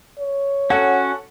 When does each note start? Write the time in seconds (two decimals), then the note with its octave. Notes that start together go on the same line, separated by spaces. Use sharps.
0.19 C#5
0.70 C#4 F#4 A4 F#5